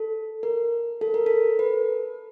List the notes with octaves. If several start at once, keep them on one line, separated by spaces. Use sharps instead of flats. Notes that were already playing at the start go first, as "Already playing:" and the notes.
Already playing: A4
A#4
A4
A#4
A4
B4